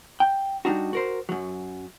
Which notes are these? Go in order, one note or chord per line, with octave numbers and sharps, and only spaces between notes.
G5
G3 D4 D#4 F#4
F#4 A#4 C5
F#2 F#3